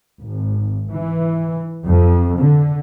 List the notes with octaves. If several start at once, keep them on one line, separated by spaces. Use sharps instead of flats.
G#1
E3
F2
D3